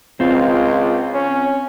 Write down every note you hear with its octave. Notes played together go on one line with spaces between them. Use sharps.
C#2 C4 F4
C#4